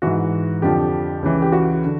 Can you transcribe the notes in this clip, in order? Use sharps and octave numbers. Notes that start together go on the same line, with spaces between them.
G#2 E3 F#4
F2 D3 F3 G4
C#2 C#3 E3
G4
F#4
D3